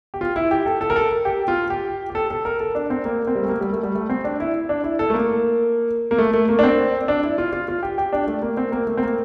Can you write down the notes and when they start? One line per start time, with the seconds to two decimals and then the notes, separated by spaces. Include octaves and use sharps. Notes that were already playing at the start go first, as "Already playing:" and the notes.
0.14 G4
0.21 F4
0.36 E4
0.51 G4
0.66 A4
0.81 A4
0.90 A#4
0.96 A4
1.25 G4
1.48 F4
1.70 G4
2.10 G4
2.15 A4
2.30 A4
2.45 A#4
2.60 A4
2.75 D4
2.90 C4
3.05 A#3
3.27 C4
3.35 G3
3.43 A3
3.49 A#3
3.61 G3
3.72 A3
3.83 G3
3.95 A3
4.10 C4
4.24 D4
4.40 E4
4.69 D4
4.84 E4
4.99 A4
5.10 A3
5.14 A#3
6.11 A#3
6.18 A3
6.34 A3
6.49 A#3
6.59 D4
6.63 C4
7.08 D4
7.23 E4
7.38 F4
7.53 F4
7.68 F4
7.83 G4
7.98 G4
8.13 D4
8.27 A3
8.42 A#3
8.57 C4
8.72 A#3
8.87 A3
8.97 C4
9.03 A#3